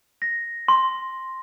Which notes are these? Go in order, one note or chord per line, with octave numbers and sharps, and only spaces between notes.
A#6
C6